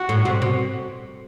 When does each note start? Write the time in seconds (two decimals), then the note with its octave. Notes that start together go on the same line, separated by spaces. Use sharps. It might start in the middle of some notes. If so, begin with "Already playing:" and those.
Already playing: F#4
0.09 A2
0.25 C3
0.42 B2